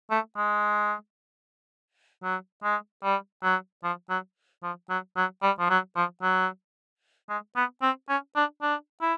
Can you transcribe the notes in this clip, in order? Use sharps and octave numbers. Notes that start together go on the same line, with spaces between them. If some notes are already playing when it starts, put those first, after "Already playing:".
A3
G#3
F#3
G#3
G3
F#3
F3
F#3
F3
F#3
F#3
G3
F3
F#3
F3
F#3
G#3
B3
C4
C#4
D4
D4
E4